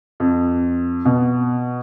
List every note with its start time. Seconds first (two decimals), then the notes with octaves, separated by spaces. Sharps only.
0.20 F2
1.05 B2